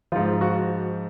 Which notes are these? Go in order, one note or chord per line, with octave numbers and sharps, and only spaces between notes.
G#2 F3 F4
F#4